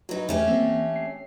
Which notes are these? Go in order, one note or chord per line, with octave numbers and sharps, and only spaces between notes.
F#3 D#4 F#4 B4
E2 A3 C#4 G4
E3 A#3 C4
C7